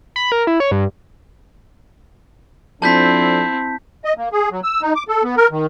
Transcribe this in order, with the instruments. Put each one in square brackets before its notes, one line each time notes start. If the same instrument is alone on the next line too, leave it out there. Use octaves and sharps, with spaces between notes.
[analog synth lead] B5
A#4
E4
C#5
G2
[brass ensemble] F3 D4 A4 [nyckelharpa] C4 E4 [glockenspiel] A5 G6 B6
[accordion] D#5
A#3
G#4
F#3
E6
D#4
D6
A4
B3
A#4
D#3